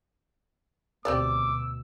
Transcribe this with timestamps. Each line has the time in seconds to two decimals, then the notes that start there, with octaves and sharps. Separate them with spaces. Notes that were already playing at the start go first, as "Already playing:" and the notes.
1.05 D2 B2 C4 G4 D5 D6 E6